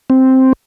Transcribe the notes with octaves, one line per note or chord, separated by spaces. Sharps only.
C4